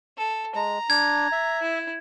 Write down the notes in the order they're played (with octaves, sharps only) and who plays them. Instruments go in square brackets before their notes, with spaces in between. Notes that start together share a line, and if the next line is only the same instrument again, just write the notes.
[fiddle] A4
[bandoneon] G#3 [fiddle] A#5
[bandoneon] D4 [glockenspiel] G#6
[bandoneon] E5
[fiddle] E4